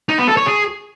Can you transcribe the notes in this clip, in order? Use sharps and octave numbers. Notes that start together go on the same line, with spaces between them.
D#4
B3
A4
C#5
G#4